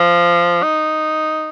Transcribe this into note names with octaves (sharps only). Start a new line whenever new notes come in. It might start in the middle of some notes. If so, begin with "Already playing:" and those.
Already playing: F3
D#4